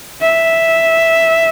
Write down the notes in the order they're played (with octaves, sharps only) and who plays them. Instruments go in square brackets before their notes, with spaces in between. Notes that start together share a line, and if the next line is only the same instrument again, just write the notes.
[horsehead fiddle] E5